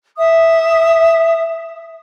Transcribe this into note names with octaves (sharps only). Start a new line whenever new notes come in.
E5 D#6